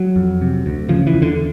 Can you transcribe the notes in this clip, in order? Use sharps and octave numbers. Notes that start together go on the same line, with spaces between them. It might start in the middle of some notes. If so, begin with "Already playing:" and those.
Already playing: F#3
F2
C3
D2
C#3 F3
E3
E2
D3